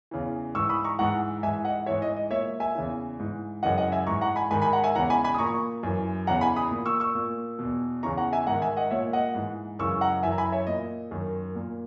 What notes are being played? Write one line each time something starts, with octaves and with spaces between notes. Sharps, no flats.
E2 C#3 E3
G#2 E3 C#6 E6
B5 D#6
A#5 C#6
G#2 E3 F#5 A#5
G#2 E3 E5 G#5
D#5 F#5
G#2 E3 C#5 E5
D#5
D#5
A#2 C#5 E5
E5 G#5
E2 C#3 E3
G#2 E3
F#2 C#3 E3 D#5 F#5
D#5 F#5
E5 G#5
G#2 E3 A#5 C#6
F#5 A#5
G#5 B5
G#2 D#3 G#5 B5
G#5 B5
F#5 A#5
E5 G#5
E2 C#3 E3 F#5 A#5
G#5 B5
G#5 B5
D#6
A#2 A#5 C#6
F#2 E3
E2 C#3 E3 F#5 A#5
G#5 B5
B5 D#6
A#2
C#6 E6
C#6 E6
A#2
E2 B2
E2 C#3 E3 A#5 C#6
F#5 A#5
E5 G#5
G#2 D#3 F#5 A#5
E5 G#5
D#5 F#5
A#2 C#5 E5
D#5 F#5
G#2 E3
F#2 C#3 E3 C#6 E6
F#5 A#5
F#2 E3 E5 G#5
A#5
G#5 B5
C#5 E5
A#2 D#5
F#2 D#3
A#2